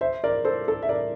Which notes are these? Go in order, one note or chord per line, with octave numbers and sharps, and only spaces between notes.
C5 E5
A#4 D5
A4 C5
A4
E5
A#4 D5